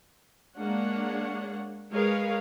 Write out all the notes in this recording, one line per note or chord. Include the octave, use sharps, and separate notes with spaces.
G#3 A#3 D4 C#5 F#5
G#3 G#4 A#4 B4 C#5 F5